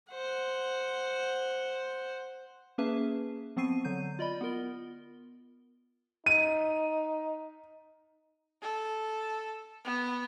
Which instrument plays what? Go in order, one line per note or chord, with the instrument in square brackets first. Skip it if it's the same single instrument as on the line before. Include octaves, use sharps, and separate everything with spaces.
[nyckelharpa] C5 F#5
[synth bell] A#3 C#4 G#4 B4 E5 A5
F3 B3 C4 C#6 C7 D#7
D3 F#3 G6 D#7
F4 D5 D#5 B5
B3 F4 A#4 G7
[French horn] D#4 [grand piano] D#7
[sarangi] A4
B3